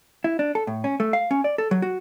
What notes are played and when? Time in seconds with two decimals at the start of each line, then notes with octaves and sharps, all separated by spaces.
0.24 E4
0.39 D4
0.55 A4
0.67 A2
0.84 C#4
1.00 A3
1.13 F5
1.31 C#4
1.44 D5
1.58 A4
1.71 F#3
1.82 F#4